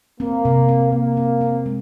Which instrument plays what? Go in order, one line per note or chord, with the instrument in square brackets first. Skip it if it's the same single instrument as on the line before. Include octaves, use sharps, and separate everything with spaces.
[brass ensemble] A#3 [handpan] C4
[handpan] C3
C4
[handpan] C3 [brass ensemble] A#3
[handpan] C4
C4
G#3